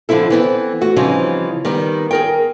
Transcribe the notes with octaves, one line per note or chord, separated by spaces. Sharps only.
D3 F3 C4 E4 A4
E3 B3 C4
A3 F#4
C#3 E3 F3 G3 C4 D#4
D#3 G3 B3
G#4 A#4 G5